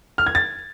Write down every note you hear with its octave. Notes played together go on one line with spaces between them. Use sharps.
F6
G#6
A6